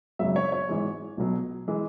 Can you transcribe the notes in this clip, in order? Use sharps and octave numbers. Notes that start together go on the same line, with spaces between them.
G#1 F#2 C#3 F#3 E5
C#5
C#5
G#1 G#2 E3 G#3
B1 B2 F#3
E3 G#3